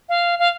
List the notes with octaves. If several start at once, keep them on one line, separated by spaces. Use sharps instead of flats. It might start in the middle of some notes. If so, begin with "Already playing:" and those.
F5
F5